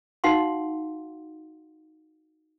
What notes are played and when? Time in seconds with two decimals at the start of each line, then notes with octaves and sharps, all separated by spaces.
0.24 D#4 F#4 F5 F#5 C6